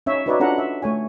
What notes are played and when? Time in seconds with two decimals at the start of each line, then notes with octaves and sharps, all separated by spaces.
0.06 C#4 D#4 C#5 E5
0.26 D#4 F#4 B4 C#5 D5 E5
0.40 C#4 D4 F4 A4 F#5 A#5
0.58 E5
0.82 A3 C#5 G#5